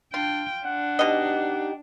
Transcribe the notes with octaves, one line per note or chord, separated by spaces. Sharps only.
D4 F4 G5
D4 F#5
B2 D#4 G4 D#5